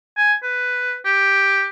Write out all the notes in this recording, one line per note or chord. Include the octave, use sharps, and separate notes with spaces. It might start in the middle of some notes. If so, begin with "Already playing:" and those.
G#5
B4
G4